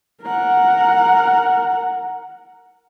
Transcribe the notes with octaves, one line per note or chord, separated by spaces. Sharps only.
A#4 F#5